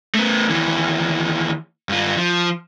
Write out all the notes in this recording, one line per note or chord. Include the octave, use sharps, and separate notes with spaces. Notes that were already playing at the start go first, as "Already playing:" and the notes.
A3 B3
D#2 E3
G2 F4
F3